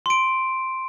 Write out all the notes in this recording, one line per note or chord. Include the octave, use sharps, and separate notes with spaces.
C6 D7